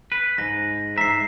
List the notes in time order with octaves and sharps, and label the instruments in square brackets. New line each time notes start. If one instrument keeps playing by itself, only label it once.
[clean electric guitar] B4
[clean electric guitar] G#2 [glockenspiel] A#6
[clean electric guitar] G#2 E5 [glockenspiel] A#5 C7